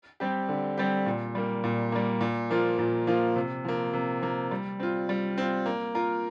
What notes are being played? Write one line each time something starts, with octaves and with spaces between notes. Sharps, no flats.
G3 C4 G4
D3
G3 C4 G4
A#2
G3 A#3
A#2
G3 A#3
A#2
F3 A#3 F4
A#2
F3 A#3 F4
C3
F3 A#3
C3
F3 A#3
G3
C4 F4
G3
C4 F4
A#3
F4 A#4